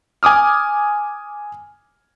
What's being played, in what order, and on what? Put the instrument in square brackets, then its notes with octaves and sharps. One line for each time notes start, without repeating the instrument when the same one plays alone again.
[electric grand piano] G#5 D6 D#6 F6